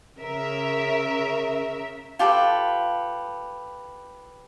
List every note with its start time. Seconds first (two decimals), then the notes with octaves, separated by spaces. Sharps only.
0.19 C#3 A#4 E5
2.19 F4 G4 A4 B4